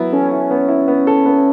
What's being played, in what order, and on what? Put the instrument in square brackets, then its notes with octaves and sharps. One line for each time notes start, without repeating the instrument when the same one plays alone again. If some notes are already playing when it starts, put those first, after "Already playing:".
Already playing: [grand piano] F#3 B3 E4
[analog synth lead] C#4 [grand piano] A4
[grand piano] E4
B3
E4
B3
A4
B3